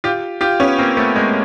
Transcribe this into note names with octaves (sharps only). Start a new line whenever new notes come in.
F4 G4
F4 G4
B3 C#4
A#3 C4
A3 B3
G#3 A#3